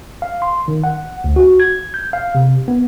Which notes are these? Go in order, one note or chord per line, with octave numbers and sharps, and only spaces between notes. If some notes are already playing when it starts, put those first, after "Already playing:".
F5
C6
D#3
F#5
D2
F#4
G#6
G6
F5
C3
B3